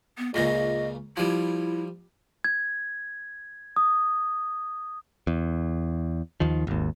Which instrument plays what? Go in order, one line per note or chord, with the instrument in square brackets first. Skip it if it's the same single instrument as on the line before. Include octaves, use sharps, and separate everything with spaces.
[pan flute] B3
[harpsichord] C#2 A#2 C#3 [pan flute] D#5
[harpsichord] F3 G3 [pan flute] E4
[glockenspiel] G#6
D#6
[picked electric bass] E2
D#2 D#3 F3
G#1 D#2